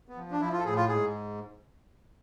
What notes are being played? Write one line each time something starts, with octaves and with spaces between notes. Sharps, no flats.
B3
F3
D4
F3 E4
F4
A4
A2 G#4
F4
G#2 G#4